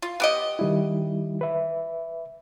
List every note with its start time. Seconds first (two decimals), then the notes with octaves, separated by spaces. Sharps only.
0.02 F4
0.20 B3 G4 D#5
0.59 D#3 G3 E4
1.41 B4 E5